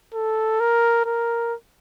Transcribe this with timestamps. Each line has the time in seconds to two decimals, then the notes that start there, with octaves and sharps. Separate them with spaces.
0.14 A4
0.60 A#4
1.05 A#4